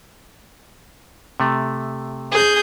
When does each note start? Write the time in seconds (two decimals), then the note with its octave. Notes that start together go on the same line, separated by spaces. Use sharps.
1.40 C3 A3
2.31 G#4 G6